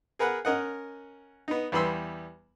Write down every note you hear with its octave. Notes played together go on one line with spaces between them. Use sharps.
G#4 A#4 B4 F#5
C#4 A#4 D#5 F#5
B3 D#4
E2 G3 B3 B5 C6 E6